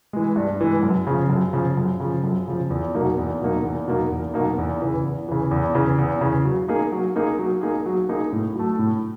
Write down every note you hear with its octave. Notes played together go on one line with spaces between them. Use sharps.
E3 G#3
G2
E3 G#3
F#2
C#3 F3
F#2
C#3 F3
F#2
C#3 F3
F#2
C#3 F3
E2
B2 F#3 A#3 D#4
E2
B2 F#3 A#3 D#4
E2
B2 F#3 A#3 D#4
E2
B2 F#3 A#3 D#4
E2
C#3 E3
E2
C#3 E3
E2
C#3 E3
E2
C#3 E3
F#3
A#3 D#4 G#4
F#3
A#3 D#4 G#4
F#3
A#3 D#4 G#4
F#3
A#3 D#4 G#4
A2
F#3 A3
A2